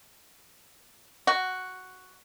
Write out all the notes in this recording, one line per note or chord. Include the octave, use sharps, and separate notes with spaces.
F#4